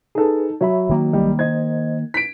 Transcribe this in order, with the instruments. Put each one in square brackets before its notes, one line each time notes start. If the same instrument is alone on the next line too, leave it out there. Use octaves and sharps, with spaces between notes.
[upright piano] D#4 A4 [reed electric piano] G#4 B4
[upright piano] F#3 [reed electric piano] C#5 E5 B5
[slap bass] D#3 A#3
[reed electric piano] C2 F#3 D#5 [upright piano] G3
[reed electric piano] C5 D#5 [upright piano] G#6
[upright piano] B6 D7